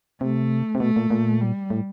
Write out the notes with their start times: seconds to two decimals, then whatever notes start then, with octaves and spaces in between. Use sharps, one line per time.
0.21 C3 A3
0.75 C3
0.80 B2 A3
0.96 A#2
1.11 A#2
1.41 G3
1.70 A2